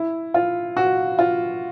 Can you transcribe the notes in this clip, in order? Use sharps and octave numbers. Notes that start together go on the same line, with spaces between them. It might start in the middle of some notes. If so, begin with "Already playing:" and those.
Already playing: E4
F4
F#4
F4